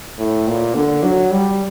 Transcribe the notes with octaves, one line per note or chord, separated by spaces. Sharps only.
A2
A#2
D3
F#3
G3